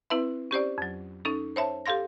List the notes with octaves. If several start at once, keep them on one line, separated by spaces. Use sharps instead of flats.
C4 E4 B4 E5
C#4 G4 C5 D5
F2 F#3
C#4 D#4 A4
C5 C#5 E5 A5
G4 A4 F5 C6 A#6